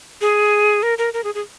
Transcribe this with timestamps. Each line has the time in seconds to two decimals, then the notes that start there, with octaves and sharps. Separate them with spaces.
0.21 G#4
0.83 A#4
0.98 A#4
1.14 A#4
1.24 G#4
1.35 G#4